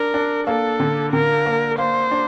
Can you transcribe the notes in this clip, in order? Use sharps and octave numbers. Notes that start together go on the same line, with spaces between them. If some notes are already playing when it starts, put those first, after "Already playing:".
Already playing: D4 A#4
D4
A#3 A4
D3
D3 A#4
A#3
A#3 C5
D4